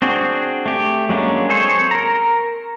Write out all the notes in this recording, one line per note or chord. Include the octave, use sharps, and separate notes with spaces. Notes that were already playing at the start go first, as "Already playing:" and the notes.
C4 D4 F#4 G#4
A3 G4
F#3 G#3 A#3 C#4 D4
C4 G#4 A4 C5 C#5
A#4 A#5